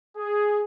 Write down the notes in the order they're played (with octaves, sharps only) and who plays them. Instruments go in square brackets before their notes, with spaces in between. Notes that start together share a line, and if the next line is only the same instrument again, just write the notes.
[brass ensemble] G#4